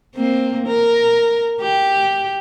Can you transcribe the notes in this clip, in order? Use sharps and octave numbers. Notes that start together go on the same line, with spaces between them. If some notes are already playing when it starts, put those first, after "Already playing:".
A#3 C4
A#4
G4